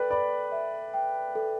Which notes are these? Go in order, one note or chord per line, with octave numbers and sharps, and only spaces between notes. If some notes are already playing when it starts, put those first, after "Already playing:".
Already playing: A4 B4 D5 G5
D5 B5
E5
G5
A4